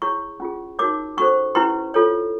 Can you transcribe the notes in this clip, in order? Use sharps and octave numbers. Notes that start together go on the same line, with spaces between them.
E4 G#4 C#5 C#6
C#4 F4 G#4
D#4 F#4 A#4 C#5 D6
C#4 F#4 A4 C5 C#6
C#4 E4 G4 B4 C6
F4 A4 C#5